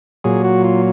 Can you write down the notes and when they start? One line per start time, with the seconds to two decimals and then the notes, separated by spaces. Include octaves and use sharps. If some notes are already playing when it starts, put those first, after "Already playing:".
0.24 A#2 F#3 G#4
0.45 F#4
0.64 F4